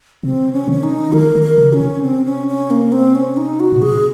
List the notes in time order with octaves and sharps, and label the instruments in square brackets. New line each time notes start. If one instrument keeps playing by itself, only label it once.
[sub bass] C3 [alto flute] C4
[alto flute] C#4
[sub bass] D#3 [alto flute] C#4
[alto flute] D#4
[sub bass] D#3 [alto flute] A#4
[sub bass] D#3
[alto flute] A#4
[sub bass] C#3
[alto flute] C#4
[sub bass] C3
[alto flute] C4
C#4
C#4
A#3
C4
C#4
D#4
F#4
[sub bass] A#2
[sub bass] C3 [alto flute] G#4